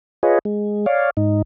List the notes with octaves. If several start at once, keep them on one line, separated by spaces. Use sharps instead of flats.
F4 G#4 B4 C#5 D#5
G#3
C#5 D5 F5
G#2 D#4